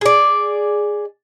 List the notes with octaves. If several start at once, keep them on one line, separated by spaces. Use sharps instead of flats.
G#4 D5